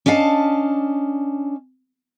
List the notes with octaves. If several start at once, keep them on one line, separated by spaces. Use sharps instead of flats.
C#4 D4 D#5 F5 A5